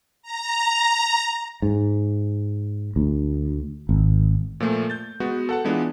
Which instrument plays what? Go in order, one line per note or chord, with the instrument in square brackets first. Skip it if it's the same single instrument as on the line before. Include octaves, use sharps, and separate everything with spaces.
[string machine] A#5
[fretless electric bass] G#2
D2
G#1
[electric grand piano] A#2 F3 A3
G6 A6
G#3 B3 F#4
A4 F#5 A5
E3 G#3 B3 D4 F4